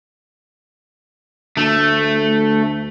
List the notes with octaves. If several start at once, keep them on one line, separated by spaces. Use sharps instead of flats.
D2 A3